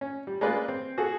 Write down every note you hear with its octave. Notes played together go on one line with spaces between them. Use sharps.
C#4
G3
G#3 A#3 C#4 F4 B4 D5
C4
F#4 G#4 A4